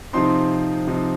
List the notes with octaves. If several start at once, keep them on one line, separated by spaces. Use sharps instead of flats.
C3 F3 C4 D#4 C6
C3 F3 C4 D#4